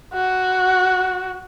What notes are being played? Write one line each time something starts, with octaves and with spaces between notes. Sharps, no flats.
F#4